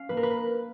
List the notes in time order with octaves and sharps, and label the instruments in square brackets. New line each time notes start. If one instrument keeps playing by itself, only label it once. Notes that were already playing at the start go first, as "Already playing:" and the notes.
Already playing: [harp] C#4 F5
A#3 B4
A#4
B4